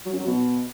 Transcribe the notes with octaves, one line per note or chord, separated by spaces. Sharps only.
F#3
F#2
F#3
B2